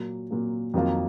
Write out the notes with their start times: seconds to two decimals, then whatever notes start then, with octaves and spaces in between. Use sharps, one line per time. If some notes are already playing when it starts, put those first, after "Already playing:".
Already playing: A#2 F#3 A#3
0.31 A#2 F#3 A#3
0.74 F2 D#3 F#3 A#3 F4